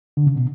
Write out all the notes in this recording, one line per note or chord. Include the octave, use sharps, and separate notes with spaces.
D3
C#3
B2